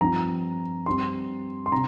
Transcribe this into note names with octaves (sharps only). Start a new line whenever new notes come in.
G2 F3 C4 A#5
G2 G3 C4 C6
C6
C3 C4 A#5